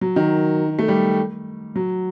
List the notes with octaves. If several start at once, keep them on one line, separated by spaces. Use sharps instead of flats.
F#3
D#3
A3
G3
F#3